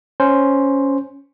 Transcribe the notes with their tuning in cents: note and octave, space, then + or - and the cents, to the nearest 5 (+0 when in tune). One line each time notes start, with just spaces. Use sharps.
C#4 +0 C5 +0